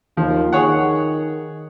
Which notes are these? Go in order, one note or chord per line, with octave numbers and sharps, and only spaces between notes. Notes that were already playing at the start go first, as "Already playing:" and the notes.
D#2 F3
D#3 G#4 C#5 F#5